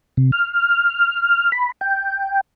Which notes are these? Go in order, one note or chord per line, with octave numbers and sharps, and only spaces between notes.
C3
F6
B5
G5